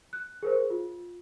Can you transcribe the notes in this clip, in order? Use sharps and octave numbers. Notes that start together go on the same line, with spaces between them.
F#6
G#4 A#4 C5
F4